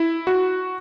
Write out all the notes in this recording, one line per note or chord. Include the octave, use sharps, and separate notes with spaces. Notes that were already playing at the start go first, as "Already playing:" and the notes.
Already playing: E4
F#4